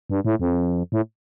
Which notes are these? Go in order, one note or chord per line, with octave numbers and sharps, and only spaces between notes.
G2
A2
F2
A2